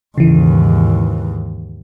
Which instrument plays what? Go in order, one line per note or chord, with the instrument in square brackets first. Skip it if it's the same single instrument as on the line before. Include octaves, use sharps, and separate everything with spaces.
[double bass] D#2 G#2 [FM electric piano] C#3 E3